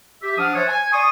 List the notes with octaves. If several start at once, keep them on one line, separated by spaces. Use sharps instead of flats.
G4 E5
F3 D4 F#5 D#6 F6
C5 C#5 E5 F#5 A5
G#5
D5 C6 C#6 D#6